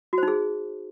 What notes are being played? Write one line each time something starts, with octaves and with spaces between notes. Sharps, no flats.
D#4 F#4 G#4 C5